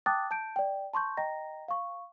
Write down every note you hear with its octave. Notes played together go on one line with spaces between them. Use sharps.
G5 A5 D6 D#6 F#6 A6
A5 G6 D7
D5 G5
A5 C6 C#6 G6
D#5 G5 A#5 A#6
F5 C#6